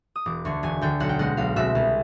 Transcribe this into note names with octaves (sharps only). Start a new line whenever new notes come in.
D#6
E1 D6
D2 D3 C#6
E1 G#5
D2 D3 G5
B1 F#5
G5
B2 G#3 C4 F#5
B1 F5
B2 G#3 C4 E5
C2